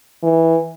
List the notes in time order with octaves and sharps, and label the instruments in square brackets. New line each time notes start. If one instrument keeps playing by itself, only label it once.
[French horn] E3